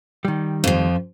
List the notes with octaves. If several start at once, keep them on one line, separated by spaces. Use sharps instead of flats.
D#3 G3
F2 F3